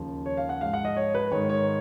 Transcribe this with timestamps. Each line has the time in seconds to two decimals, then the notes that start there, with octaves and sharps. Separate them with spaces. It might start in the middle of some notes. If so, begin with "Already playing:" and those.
Already playing: D#2 C#3 F3
0.26 C#5
0.37 F5
0.49 F#5
0.61 G#2 F3 F5
0.74 F#5
0.85 D#5
0.97 C#5
1.15 B4
1.31 G#2 D#3 C#5
1.49 C#5